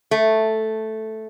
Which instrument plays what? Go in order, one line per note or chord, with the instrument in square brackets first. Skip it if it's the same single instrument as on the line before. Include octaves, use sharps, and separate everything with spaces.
[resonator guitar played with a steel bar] A3